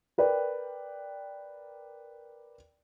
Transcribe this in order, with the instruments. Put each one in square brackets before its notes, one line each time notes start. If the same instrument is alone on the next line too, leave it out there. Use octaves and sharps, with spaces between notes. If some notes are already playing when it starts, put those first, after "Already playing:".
[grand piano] A#4 B4 D5 G5